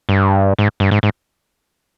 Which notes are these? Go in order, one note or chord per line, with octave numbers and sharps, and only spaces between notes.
G2
G#2
G2
G#2
G#2